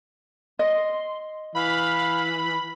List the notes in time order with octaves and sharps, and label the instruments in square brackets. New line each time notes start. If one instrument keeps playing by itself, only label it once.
[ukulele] D#5 [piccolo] C6
[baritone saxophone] E3 [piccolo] F5 [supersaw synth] B5